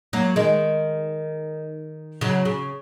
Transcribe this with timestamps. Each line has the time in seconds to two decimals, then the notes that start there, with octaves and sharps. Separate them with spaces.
0.13 F#3 A#3
0.36 D#3 G#3
2.21 C#3 F#3
2.45 C#3